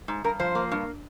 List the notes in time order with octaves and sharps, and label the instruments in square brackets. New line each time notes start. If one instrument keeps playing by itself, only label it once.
[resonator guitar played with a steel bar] G#2
G2 A#4
F3 C5
A#3
G2